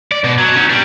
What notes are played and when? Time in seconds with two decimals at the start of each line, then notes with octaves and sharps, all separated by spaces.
0.12 D5
0.24 B2
0.38 F#3
0.56 C#4 D#4
0.69 G3 D4